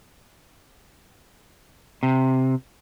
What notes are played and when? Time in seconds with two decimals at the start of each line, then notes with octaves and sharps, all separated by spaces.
2.03 C3